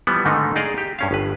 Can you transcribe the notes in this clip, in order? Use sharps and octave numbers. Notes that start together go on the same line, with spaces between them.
E3 F3 G3 B3
G#2 D3 D#3 A3 D#4
D#4 G#4 D5 D#5 F5
G4
G2 C#4 F5
G1 B4